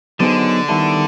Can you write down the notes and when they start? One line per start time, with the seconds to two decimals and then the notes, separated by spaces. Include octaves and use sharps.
0.20 D3 F#3 B3 D#4 G#4 C5
0.69 D#3 G3 B3 E4 A4